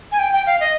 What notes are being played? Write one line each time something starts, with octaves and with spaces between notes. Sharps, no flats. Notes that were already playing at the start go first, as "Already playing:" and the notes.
G#5
G5
G5
F5
D#5